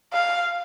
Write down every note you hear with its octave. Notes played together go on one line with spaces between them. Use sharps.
F5